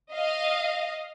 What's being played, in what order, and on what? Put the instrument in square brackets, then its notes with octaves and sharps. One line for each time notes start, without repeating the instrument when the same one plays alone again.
[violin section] D#5 F5